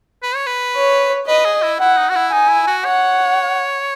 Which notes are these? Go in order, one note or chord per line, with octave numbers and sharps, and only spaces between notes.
B4
C#5
B4
C#5
B4 D#5
G#4
E4
E4 F#5
D#4
F#4
E4
D#4 G#5
E4
F#4
C#5 F#5